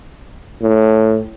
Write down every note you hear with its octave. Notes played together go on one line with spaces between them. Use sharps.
A2